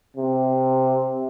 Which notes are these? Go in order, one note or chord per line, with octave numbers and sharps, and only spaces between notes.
C3